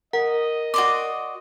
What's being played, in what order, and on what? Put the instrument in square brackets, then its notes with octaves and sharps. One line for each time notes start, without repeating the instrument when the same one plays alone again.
[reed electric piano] A#4 [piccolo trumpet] D#5 [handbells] F#5
[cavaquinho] F#4 D5 C6 [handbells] D6